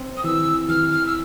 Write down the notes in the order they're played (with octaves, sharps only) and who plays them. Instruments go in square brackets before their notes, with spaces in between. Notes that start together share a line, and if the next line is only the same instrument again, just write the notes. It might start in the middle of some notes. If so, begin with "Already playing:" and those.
Already playing: [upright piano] C4
[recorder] D#6
[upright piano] E3 [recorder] E6
[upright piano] E3 [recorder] F6
[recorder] F6
E6